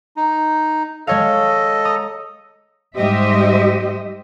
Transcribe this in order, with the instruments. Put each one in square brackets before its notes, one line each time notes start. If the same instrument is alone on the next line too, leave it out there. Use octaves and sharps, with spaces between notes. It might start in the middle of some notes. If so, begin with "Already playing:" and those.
[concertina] D#4
[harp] G#3 C#5 F5 [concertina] A4 D#5
[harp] A#5 D#6
[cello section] G#2 G3 G4 C5 D#5 E5